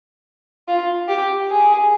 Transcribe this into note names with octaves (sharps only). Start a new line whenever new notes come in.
F4
G4
G#4